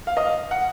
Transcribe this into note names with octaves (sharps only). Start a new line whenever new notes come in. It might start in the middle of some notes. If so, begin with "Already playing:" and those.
F5
D#5
F5
F#5